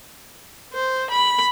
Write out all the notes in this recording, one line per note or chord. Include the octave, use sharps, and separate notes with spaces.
C5
B5